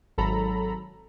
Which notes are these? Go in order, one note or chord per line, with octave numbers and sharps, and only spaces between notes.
G#1 F#3 A4 A#5 B5